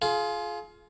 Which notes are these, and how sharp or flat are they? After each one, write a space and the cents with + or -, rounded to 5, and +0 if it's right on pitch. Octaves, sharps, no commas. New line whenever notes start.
F4 +0 G#4 +35